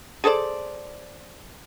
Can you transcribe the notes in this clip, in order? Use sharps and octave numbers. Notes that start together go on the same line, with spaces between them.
G#4 A4 C5 D5